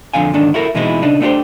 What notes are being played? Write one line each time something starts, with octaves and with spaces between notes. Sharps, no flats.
F2 D3 C4 F5 G#5
G#2 D3 D#3 D4
E4 F#4 A4 A#4 E5
B2 E3 G#3 C4 D#4 E4
C#3 D4 D#4
A3 B3 D4 E4 G4 C5